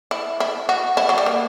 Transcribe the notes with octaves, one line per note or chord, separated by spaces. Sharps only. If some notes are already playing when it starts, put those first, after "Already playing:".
E4
E4
F#4
E4
F#3
G3
A#3